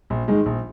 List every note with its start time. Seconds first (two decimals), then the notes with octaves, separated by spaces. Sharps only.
0.10 A#1
0.28 G#2 D#3 G#3
0.46 A#1